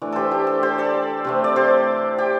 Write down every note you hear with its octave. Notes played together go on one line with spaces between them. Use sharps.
E3 A3 D4
G4 A4 C5
G4
A4
G4 C5
A4 D5
C3 A3 C4
D5
G4 C5
G4